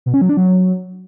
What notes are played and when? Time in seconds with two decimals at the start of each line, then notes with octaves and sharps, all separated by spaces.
0.06 B2
0.14 C#4
0.21 F#3
0.29 D4
0.37 F#3